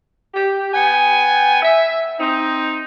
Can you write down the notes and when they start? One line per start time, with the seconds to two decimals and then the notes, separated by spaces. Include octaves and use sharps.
0.34 G4
0.74 B3 G5 G#5
1.62 E5
2.19 C4 D#4